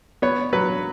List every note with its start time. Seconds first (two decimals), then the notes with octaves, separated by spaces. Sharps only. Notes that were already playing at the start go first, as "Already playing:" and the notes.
0.22 B3 C#5
0.53 F#3 B4